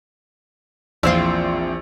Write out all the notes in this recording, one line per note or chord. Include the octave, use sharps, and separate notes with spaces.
A#1 E2 C4 E4 F4 C5 E6